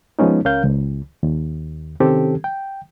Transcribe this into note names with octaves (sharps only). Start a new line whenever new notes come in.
F3 G#3 B3 C#4 D#4
C#2 C#4 A#4 F5 G6
C#2
D#2
C3 D#3 C4 C#4 G4 A4
G5